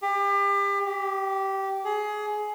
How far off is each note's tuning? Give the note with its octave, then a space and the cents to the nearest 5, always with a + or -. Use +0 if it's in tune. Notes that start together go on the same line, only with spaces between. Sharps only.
G4 +35
G4 -15
G#4 +20